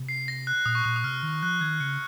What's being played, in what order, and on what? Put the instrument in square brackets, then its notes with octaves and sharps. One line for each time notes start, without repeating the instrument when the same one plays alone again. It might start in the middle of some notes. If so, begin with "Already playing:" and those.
Already playing: [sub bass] C3
[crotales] C7
A#6
F#6
[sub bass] A#2 [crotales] D#6
[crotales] C#6
[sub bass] A#2 [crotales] D#6
[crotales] D#6
[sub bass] C3 [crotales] F6
[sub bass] D#3
[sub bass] F3 [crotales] F#6
[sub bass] D#3 [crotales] G#6
[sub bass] C#3 [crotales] C#7